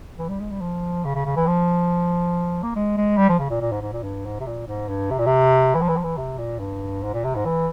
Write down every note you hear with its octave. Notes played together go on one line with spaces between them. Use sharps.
E3
G3
G#3
G3
F3
C#3
C#3
C#3
E3
F3
A#3
G#3
G#3
G3
F3
C#3
A#2
A#2
G#2
G#2
A#2
G2
G#2
C3
A#2
G#2
G2
C3
A#2
C3
E3
F3
E3
F3
E3
C3
A#2
G2
G#2
A#2
C3
G#2
E3